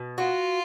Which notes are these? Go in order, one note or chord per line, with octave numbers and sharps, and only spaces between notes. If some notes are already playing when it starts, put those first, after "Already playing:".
Already playing: B2
F4 F#4